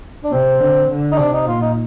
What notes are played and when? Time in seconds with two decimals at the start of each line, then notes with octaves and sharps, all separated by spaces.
0.24 D4
0.32 C3 C4
0.60 D3
0.90 D3
1.12 D#4
1.18 C3 D4
1.33 D#4
1.47 A#2 F4
1.62 D#4